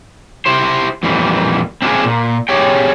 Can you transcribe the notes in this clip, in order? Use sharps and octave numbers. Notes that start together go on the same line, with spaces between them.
E4 G4 C5
F2 A#2 E3 G3
C4 D4 E4 F4 G#4
A#2
G4 G#4 C#5 G5